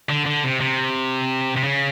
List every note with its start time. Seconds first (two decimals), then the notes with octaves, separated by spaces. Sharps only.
0.09 D3
0.26 D3
0.44 C3
0.61 C3
1.56 C3
1.64 C#3